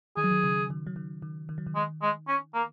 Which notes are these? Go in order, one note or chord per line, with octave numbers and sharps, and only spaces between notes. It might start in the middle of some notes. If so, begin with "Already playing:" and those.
D#3 G#4
F#3
D#3
C#3
D#3
F#3
D#3
D#3
D#3
F#3
D#3
G#3
G#3
C#4
A#3